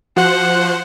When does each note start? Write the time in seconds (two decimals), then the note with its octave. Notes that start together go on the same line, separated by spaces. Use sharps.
0.16 F3 F#4 C5 F#5